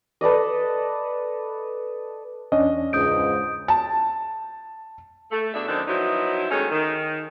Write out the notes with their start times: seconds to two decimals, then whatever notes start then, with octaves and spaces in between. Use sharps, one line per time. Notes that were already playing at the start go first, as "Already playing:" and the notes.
0.21 A4 B4 D5 D#5
2.52 E2 C#4 D4 D#5
2.93 C#2 G#2 D#6 G6 D7
3.68 A5
5.31 A3
5.53 B2 D4 G#4 E5
5.67 F#2 D#3 C4 D4
5.87 F3 F#3 B3 D#4 E4
6.51 D#3 G#3 A3 C#4
6.71 D#3